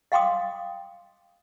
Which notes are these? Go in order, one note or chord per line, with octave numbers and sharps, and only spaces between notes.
D#5 F5 G5 C6 D6 D#6